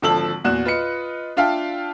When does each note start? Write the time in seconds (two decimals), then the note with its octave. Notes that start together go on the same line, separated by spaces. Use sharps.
0.02 G#1 D3 F3 A5 E6 F#7
0.44 E2 A#2 F#4 F#6 E7
0.65 F4 B4 D#5 C#7
1.37 D4 F4 E5 F5 G5 A5